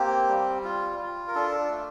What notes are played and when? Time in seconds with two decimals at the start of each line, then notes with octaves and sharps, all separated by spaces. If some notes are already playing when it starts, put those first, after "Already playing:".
Already playing: A#3 C4 G4
0.29 G3
0.64 F4
0.99 F4
1.27 A#4
1.35 D4 A4
1.70 A3